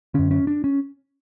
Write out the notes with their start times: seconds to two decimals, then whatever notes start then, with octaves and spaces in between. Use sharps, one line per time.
0.14 F#2 D3 C#4
0.31 C#4
0.47 D4
0.64 C#4